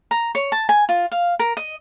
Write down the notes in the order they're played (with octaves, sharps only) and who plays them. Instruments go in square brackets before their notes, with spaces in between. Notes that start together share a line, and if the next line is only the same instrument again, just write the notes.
[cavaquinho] A#5
C#5
A5
G#5
F4
F5
A#4
D#5